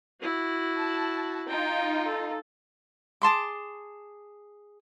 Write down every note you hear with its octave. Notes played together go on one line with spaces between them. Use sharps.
E4 F#4
A5
D#4 F4 G5
A4
G#4 A5 C6 D6